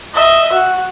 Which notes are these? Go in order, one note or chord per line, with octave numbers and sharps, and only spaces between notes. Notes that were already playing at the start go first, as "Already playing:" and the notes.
D#5 E5
F#4